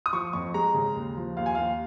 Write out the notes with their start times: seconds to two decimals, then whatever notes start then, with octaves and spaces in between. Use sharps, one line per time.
0.06 D#6
0.13 F3 C#6
0.33 F2 C#6
0.54 G#3 A#5
0.74 C#3
0.96 D#2
1.17 F3
1.37 D#2 F5
1.46 G#5
1.55 D#2 F5